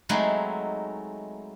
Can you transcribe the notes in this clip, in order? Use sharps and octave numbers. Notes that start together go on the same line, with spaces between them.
F#3 G#3 A3 C4 D#4 E4